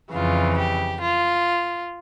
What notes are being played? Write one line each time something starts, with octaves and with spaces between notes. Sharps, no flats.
F2 C#3 E3 F4
G4
F4